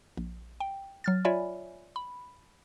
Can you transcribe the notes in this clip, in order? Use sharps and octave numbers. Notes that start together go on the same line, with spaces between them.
A#1
G5
F#3 F6 A6
F4 C#5 D5 E5 G#5 B5
B5